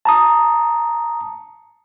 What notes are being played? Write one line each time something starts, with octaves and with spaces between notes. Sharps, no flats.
A5 A#5 D#6